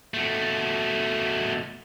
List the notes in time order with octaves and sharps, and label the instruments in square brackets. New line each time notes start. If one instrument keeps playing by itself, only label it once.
[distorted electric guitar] B2 A3